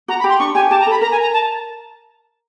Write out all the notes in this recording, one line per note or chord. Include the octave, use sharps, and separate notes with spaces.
F#4 A#5
B5
G4
C6
D4 C#6
G4 G#5
G4 A5
A#5
A4 B5
A#4 A#5
G#5
A#5
A5